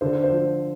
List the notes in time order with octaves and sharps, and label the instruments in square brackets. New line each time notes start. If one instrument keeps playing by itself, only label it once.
[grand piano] D3 C5
C5
F3